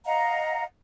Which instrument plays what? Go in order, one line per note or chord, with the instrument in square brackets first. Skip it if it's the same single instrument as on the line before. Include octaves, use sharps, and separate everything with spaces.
[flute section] D#5 F5 F#5 A#5